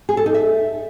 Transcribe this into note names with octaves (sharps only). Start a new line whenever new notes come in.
G#4
A4
D#4
E5